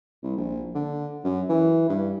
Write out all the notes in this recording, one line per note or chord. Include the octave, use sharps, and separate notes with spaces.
C2
A#1
D3
F#2
E3
G2